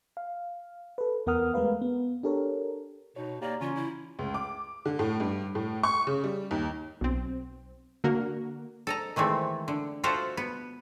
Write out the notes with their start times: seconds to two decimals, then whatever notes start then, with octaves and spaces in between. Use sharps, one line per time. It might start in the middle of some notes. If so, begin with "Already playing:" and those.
0.17 F5
0.98 A4 B4
1.26 E2 B3 A#4 F#5 D#6 F6
1.54 G#3 A3 A#4 B4 F5
1.82 B3
2.23 D4 G4 A4 A#4 C#5
3.16 B2 D#4 C#5
3.41 A#3 G4 C#5 D5 A#5
3.61 C#3 E3 C#4 F4
3.76 E4
4.19 C#2
4.34 D6
4.85 D3
4.99 A2
5.20 G2
5.55 A2
5.83 C#6
6.07 C#3
6.24 G3
6.51 D#2
7.01 B1 C4
8.04 D3 A#3 F#4 A#4
8.87 A4 D#5 A#5
9.16 D#3 E3 G#3 A3 C4
9.68 D3
10.04 F4 F#4 A4 C5 E5 F#5
10.37 B3